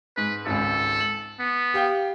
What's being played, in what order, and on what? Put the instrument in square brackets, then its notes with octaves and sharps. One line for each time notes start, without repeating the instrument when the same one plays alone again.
[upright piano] G#2 [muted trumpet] B4
[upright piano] G#1 C#2 [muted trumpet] A4
[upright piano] F#7
[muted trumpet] B3
[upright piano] G4 F5 G5